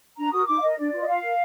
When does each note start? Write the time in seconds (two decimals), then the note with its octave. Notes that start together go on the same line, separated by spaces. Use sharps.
0.17 D4 A#5
0.32 F#4 A#4 D#6
0.47 D#4 D6
0.58 F5
0.62 A#4 D#5
0.77 D4 D5
0.92 F4 B4
1.01 D#5
1.08 F4 F5
1.23 A#4